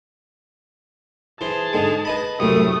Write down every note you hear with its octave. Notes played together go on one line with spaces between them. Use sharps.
E3 G#4 C5 A5
G#2 D3 G#3
B4 D#5 B5
C2 F#2 A2 A3 D#6